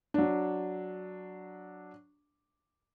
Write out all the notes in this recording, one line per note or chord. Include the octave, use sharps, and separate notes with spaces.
F#3 D4